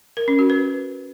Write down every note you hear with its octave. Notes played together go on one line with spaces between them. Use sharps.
A#4
C#4
F#4
B4